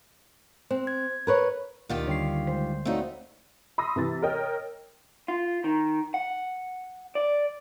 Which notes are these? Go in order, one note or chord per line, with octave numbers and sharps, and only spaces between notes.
C4 C5
G#6
A#4 B4 C#5
D2 D#3 A#3 F4 G4 F5
D3 G3 C#5 C7
G#3 C5
A3 C4 D#4 E4 F#4 C#5 D5 F5
B5 C6 D#6 E6 A#6
C3 E3 A6
A#4 C#5 D#5 G5
F4
D#3
F#5
D5